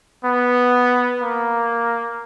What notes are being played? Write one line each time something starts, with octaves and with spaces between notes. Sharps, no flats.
B3
A#3